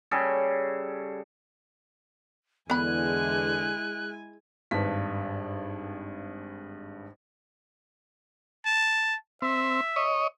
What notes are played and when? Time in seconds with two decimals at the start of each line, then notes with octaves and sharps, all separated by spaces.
0.11 C#3 G3 G#4 A4
2.70 E2 D3 G#3 B3 E4 G#5 B5 F#6
4.71 G#1 G2 B4 A5 B6
8.65 A5
9.42 C4 E5
9.96 C#5 D#5